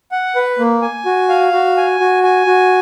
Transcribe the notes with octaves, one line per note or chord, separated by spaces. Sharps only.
F#5
B4
A#3
G#5
F#4
F5
F#4
G#5
F#4
G#5
F#4